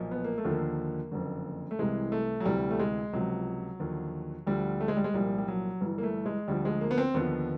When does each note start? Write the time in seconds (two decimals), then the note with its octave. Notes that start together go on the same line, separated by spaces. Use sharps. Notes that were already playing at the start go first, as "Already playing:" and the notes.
Already playing: B1 A#2 F3
0.11 B3
0.24 A#3
0.38 A3
0.45 D#2 D3 F3
0.51 A#3
1.12 F#1 F2 D3
1.71 A3
1.79 C2 C3 E3 G#3
2.12 A3
2.40 F#3
2.45 D2 C3 E3 G3
2.70 A3
2.79 G#3
3.13 C#2 C3 F3 F#3
3.80 D#2 D3 F3
4.47 D2 D3 F3 G3
4.80 A3
4.88 G#3
4.97 G3
5.04 G#3
5.14 C2 A#2 F3 G3
5.38 G3
5.48 F#3
5.81 G1 G2 E3
5.98 A#3
6.03 A3
6.26 G#3
6.48 D2 D3 F3 G3
6.65 G#3
6.81 A#3
6.91 B3
6.98 C4
7.14 D#2 D3 F3 B3